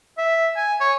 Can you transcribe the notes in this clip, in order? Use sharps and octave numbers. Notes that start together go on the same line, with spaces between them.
E5
G#5
C#5